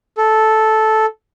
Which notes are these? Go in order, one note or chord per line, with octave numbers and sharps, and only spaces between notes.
A4